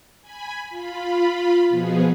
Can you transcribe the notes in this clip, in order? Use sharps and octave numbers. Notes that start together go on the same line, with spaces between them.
G#5 B5
F4 B5
B2 F3 B3 G#4